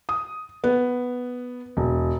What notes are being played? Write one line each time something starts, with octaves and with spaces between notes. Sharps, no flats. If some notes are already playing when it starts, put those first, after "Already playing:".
D#6
B3
E1